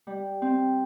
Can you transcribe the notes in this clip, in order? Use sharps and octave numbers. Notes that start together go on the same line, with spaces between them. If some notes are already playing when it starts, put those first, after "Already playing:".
G3
C4